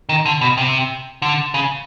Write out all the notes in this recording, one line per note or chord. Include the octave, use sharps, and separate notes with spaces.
D#3
D3
B2
C3
D3
C#3